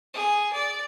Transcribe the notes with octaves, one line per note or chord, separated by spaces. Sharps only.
G#4
D5